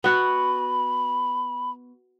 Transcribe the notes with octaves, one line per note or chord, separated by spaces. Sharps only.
B3 F#4 B5